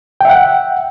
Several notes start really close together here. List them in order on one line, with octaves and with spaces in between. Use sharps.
G5 E5 F#5